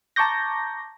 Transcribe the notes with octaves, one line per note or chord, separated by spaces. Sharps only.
A5 A#5 C#6 D6 G6 A#6